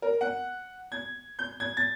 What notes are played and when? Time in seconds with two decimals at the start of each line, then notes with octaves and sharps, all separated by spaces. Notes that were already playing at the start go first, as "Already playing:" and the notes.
0.02 A#4
0.21 F#5
0.92 G#6
1.39 G6
1.60 G#6
1.77 A6